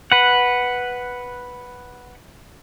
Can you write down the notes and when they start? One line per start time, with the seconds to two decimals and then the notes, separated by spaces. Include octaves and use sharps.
0.12 B4 F#5